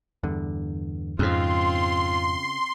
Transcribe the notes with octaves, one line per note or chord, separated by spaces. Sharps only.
E2 G2 D3
F2 G#2 C#3 C4 F4 C6